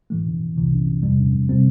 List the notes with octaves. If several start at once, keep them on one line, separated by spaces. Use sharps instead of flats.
A2 E3 A3
C2 C3 E3
E2 C3 G3
C3 G3 C4